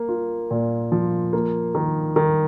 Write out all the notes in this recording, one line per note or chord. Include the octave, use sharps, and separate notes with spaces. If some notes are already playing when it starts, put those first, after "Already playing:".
Already playing: A#3
F4
A#2
F3
A#3
D#3
D#3